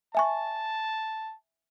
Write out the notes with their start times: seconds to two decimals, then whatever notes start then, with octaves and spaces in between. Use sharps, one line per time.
0.15 E5 G#5 A5 C#6